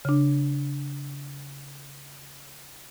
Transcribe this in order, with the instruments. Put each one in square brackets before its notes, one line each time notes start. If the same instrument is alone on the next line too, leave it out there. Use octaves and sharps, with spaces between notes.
[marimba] C#3 D4